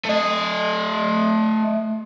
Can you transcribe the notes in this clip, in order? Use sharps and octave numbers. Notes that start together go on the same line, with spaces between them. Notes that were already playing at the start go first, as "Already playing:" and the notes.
A3 D#5